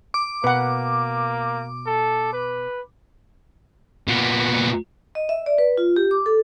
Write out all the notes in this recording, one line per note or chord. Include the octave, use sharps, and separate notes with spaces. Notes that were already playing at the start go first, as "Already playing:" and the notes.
D6
B2 A#3 B4 F#5
A4
B4
A#2 B3
D#5
E5
D5
B4
F4
G4
D6
A4